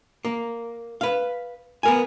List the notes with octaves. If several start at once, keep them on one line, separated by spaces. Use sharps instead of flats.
A#3
B4 F5
B3 A#4 G#5